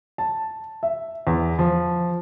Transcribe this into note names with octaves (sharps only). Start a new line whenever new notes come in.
A5
E5
E2
F3